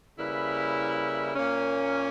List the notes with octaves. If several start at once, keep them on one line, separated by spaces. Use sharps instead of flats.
C#3 G3 A#3 E4 B4
A#2 A#3 C#4